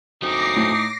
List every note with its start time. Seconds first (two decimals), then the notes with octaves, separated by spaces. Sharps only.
0.23 F#3 C4 D#4 D6 A#6 C7
0.56 A2